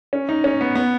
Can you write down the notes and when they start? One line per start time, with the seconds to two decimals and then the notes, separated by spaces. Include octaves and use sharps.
0.13 C#4
0.29 D#4
0.44 C#4
0.61 B3
0.75 B3